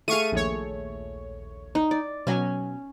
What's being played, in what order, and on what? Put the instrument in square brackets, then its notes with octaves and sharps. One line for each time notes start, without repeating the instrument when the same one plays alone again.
[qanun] A3 G#4 [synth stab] F5 C#6 D#7
[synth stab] A#1 D#2 C#5
[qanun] D#4
D5
[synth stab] B2 F#3 [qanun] C#4 G#5